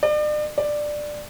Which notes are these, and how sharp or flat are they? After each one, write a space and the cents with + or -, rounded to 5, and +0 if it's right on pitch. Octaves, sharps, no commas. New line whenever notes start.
D5 +40
D5 +10